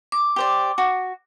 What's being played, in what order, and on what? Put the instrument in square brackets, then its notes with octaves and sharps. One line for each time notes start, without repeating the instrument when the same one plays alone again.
[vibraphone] D6
[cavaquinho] G4 C5 D5
F#4